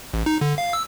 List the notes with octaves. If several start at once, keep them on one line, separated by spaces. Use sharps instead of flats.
A1
D#4
D3
F5
E6